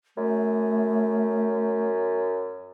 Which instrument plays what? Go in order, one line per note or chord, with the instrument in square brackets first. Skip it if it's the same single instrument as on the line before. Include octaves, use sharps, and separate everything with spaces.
[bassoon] F#2 [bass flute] A3